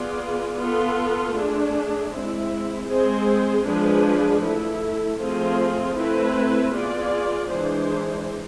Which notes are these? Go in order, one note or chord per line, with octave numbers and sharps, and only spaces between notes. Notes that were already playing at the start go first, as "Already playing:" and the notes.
Already playing: B3 F4 G#4 D5
B3 F4 A4
A3 D4 G#4
G#3 C4 E4
G#3 C4 G#4 C5
F3 G#3 D4 G#4 B4
A3 E4 A4
F3 A3 C4 F4 G#4
A3 C4 E4 B4
B3 F4 G#4 D5
E3 G#3 D4 G#4 C5